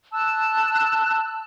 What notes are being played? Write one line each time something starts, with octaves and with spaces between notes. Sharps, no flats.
A5 E6 F#6